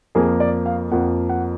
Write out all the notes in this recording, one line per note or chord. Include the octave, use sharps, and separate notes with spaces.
F2 F3 A#3 G#4
D5
F5
F2 F3 A#3 F#5
F#5